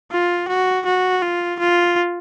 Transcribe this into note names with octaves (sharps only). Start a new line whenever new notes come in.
F4
F#4
F#4
F4
F4